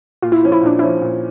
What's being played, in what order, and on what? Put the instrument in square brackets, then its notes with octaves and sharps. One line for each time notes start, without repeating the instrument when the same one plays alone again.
[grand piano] A#2 [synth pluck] F4
[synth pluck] E4
[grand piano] F3 C#4
[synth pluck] E4
[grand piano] A#2 [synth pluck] D4
[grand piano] F3 C#4 [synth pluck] E4
[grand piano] A#2